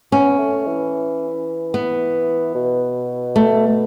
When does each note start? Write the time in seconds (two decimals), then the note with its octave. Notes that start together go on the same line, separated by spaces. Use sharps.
0.12 B3 C#4
0.39 A3
0.66 E3
1.74 B3
2.55 B2
3.36 A3